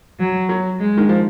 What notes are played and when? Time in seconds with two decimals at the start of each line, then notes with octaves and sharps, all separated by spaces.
0.19 F#3
0.49 F#3
0.79 G#3
0.97 D#3
1.09 F3